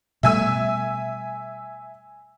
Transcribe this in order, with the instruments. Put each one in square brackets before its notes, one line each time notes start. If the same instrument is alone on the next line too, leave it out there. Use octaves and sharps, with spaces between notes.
[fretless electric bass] B2 G3 A3 [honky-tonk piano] E5 G#5 E6